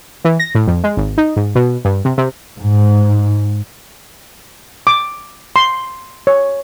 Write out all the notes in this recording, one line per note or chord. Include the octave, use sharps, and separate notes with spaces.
E3
A#6
A2
F2
G#3
G#1
D#4
G#2
B2
G2
C3
C3
G#2
D6
C6
C#5